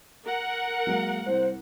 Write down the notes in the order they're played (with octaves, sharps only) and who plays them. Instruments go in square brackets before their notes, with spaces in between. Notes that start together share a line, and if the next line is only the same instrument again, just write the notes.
[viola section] A#4 F#5
[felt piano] F#3 G#3 A#3
[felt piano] C2 [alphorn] C5